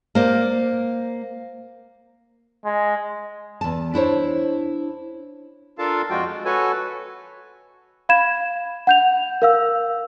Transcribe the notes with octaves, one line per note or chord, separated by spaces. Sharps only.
A#3 C5 D5
G#3
E2 A5
D4 E4 C5 C#5
D4 F4 A4 A#4 F5 A5
F2 F3 G#3 F4 F#4 G5
G#3
F#4 A4 B4 C#5 G#5
F5 B5 G#6 E7
F#5 G6 F7
A#4 F5 E6